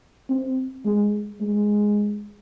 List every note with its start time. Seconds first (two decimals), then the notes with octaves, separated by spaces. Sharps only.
0.30 C4
0.85 G#3
1.41 G#3